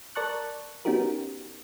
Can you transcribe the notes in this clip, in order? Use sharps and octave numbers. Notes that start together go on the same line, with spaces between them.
A#4 D5 A5 C#6 F#6
B3 C#4 D#4 F#4 G4 A#4